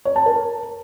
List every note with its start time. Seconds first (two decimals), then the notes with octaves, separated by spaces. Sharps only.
0.05 C#5
0.16 A5
0.26 A#4